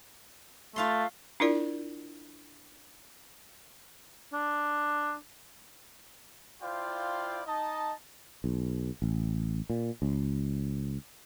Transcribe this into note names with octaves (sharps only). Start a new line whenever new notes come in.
A3 F4 F5 C6
D4 E4 F4 A#4 D5
D4
E4 F4 C5 D5 F5 G5
D#4 D#5 A5
B1
A1
A#2
C#2